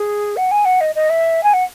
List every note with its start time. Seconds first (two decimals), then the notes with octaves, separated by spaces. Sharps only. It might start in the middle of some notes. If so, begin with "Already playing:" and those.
Already playing: G#4
0.36 F#5
0.51 G#5
0.65 F#5
0.80 D#5
0.95 D#5
1.09 E5
1.43 G#5
1.53 F#5